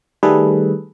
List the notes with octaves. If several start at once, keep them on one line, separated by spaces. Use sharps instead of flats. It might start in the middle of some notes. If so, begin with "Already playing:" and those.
D#3 G3 A3 G#4 A4 B4